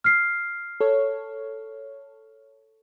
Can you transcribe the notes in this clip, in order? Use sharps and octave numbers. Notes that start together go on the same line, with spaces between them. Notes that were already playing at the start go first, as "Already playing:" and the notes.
F6 C7
A4 C#5